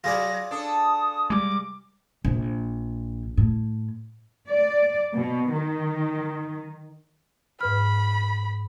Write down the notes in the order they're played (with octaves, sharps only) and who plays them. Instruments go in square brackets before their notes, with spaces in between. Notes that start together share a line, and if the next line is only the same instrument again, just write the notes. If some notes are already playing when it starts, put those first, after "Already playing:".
[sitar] F#3 [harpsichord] F4 G#4 D5 [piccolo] A#6
[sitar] D4 A4 [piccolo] D#6
[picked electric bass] G3 G#3 [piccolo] D6
[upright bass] A#1
A2
[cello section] D5
B2
D#3
[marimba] G#2 B4 F6 [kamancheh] B5